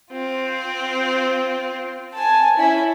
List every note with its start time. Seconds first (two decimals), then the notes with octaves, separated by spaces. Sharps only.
0.11 C4 F4
2.15 G#5 A5
2.57 C#4 E4 E5